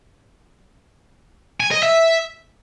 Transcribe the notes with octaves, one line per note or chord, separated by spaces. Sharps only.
G#5
D#5
E5